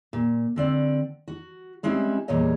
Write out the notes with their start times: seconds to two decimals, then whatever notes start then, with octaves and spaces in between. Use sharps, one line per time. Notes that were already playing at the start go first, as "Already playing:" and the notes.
0.13 A#2
0.56 D3 C4 D5
1.28 F#4
1.83 G3 G#3 C4 C#4 E4
2.28 E2 A#2 G3 C#5 D#5